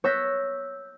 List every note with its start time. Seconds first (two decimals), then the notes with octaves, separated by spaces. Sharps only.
0.04 C#5 E6 F#6 G6 A#6 B6